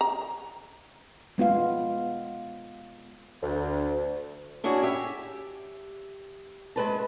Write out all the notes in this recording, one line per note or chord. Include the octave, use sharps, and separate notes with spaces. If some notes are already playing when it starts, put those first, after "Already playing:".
A#5
G#3 B3 F4 F5
D2
C#4 D4 E4 F#4 G#4
G4 E5
G#3 B4 A5